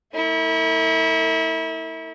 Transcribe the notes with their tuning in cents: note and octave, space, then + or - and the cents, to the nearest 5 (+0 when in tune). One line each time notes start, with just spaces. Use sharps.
A#3 -45 E4 -30